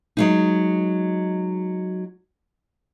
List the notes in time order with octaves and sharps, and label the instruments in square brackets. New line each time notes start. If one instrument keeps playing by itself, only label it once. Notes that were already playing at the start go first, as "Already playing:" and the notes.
[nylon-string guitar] F#3 G#3 D#4